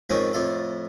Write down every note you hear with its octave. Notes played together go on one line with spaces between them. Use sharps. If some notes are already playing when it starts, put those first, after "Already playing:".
F2 G#2 D#3 A#3 C4 C#4
F2 A2 F4 A4